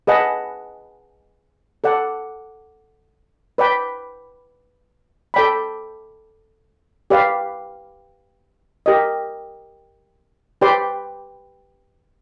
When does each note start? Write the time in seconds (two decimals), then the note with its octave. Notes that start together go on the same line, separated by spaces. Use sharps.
0.07 G#4 B4 D#5 F#5 A5
1.84 A4 D5 F#5
3.58 B4 D5 G5 B5
5.34 A4 D5 G5 B5
7.10 G4 B4 D5 F5
8.86 G4 A#4 D#5
10.61 G4 B4 D5 G5 C6